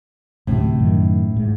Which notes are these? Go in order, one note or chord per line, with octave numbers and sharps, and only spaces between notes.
D1 D2 A2 C3
F#2 D#3
G#2